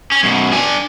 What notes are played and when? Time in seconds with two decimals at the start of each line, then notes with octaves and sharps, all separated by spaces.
0.12 C#4
0.23 F#2 B2
0.52 D4 G#5